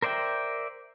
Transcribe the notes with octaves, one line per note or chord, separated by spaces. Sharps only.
A#4 C5 D5 E5 G5